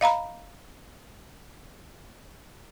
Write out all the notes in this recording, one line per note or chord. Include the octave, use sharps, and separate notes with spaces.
D#5 F5 A#5 B5